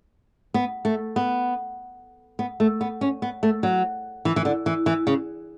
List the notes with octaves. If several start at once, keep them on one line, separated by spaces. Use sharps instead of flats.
B3
A3
B3
B3
A3
B3
C#4
B3
A3
F#3
E3
E3
D3
E3
E3
C#3